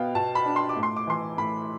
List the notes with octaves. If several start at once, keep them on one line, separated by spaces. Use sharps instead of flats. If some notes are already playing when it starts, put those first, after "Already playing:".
Already playing: B2 B3 F5 G5
B2 A5
B5
D4
C6
D6
A2
C6
D6
E3 C6
A2 B5